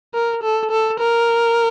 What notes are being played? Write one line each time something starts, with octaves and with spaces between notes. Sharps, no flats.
A#4
A4
A4
A#4